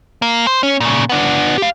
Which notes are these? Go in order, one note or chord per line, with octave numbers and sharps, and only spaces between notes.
A#3
C5
C#4
A#2 C#3
B3 D4
G4 F5